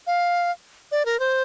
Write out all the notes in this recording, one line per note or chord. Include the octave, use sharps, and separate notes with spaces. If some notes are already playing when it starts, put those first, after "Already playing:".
F5
D5
A#4
C5